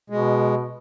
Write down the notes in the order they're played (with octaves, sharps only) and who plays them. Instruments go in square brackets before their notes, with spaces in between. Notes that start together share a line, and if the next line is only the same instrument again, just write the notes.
[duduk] B2 [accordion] G#3